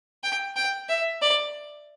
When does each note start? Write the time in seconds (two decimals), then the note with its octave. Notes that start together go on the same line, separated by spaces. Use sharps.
0.24 G5
0.56 G5
0.89 E5
1.23 D5